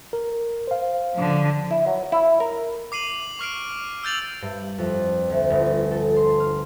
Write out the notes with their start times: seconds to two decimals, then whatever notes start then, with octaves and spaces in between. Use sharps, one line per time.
0.13 A#4
0.67 C5 F5
1.14 D3 F3
1.71 E4
1.87 F#3
2.12 E4
2.40 A#4
2.92 D6 C7 D#7 F#7
3.39 C#6 F6 C7 D7
4.04 E6 G6 A6 F7 F#7
4.42 G2
4.78 F2
5.30 D2
5.50 G1
5.91 A4
6.16 C6
6.40 F6